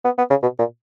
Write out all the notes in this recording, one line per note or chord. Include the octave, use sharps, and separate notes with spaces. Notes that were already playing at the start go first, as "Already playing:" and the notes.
B3
B3
C#3
B2
A#2